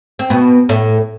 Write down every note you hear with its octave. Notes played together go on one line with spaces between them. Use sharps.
C4
B2 B3
A2 A3